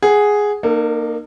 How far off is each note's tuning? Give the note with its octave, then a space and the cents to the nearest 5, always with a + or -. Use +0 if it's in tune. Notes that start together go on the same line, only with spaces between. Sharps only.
G#4 +0 F#5 +10
A#3 +0 D#4 -35 A4 +40